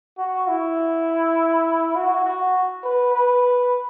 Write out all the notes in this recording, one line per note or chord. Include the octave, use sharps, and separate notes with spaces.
F#4
E4
F#4
F#4
B4
B4